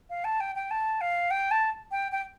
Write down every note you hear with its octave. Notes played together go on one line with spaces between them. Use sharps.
F5
A5
G5
G5
A5
F5
G5
A5
G5
G5